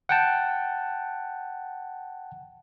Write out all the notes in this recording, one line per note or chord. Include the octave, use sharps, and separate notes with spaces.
F#5 G5 A5